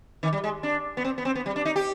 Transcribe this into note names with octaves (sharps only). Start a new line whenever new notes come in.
D#3
G3
G#3
D4
B3
C4
B3
C4
B3
G3
D4
D#4
G4